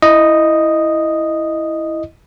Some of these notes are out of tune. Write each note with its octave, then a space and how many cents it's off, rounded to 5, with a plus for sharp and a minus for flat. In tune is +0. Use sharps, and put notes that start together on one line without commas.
E4 +0 D#5 -5